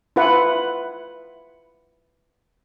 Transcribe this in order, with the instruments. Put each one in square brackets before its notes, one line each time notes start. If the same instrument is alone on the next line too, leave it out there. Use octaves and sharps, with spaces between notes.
[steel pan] E4 F4 B4 F#5